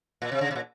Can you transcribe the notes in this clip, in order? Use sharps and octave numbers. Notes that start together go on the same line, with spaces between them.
A#2
C3
C#3
C3
A#2